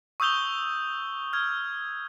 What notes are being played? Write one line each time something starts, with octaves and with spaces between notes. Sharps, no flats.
C#6 D#6 E6 G6 F7 G7
F6 G#6